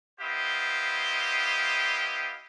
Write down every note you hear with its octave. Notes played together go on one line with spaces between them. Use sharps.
B3 E4 G4 C5 D#5 F5